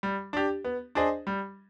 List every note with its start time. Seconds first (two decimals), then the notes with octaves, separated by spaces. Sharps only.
0.03 G3
0.33 D4 G4
0.64 B3
0.95 D4 G#4 C5 D#5
1.27 G3